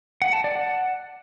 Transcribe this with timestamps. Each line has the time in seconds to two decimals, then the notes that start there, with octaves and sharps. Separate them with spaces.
0.22 F#5
0.33 A5
0.44 D5
0.56 F#5